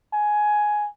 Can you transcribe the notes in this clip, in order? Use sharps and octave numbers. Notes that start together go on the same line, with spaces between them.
G#5